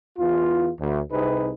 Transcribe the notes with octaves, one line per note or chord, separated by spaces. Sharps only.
E2 F4
D2
C2 C3 D#4 G#4 B4